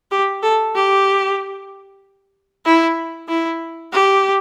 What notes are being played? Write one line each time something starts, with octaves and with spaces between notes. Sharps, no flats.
G4
A4
G4
E4
E4
G4